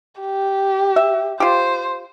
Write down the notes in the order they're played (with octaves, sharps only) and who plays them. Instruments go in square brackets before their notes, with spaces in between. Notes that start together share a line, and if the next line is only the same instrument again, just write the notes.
[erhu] G4
[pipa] E5
[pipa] F4 G4 [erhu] C5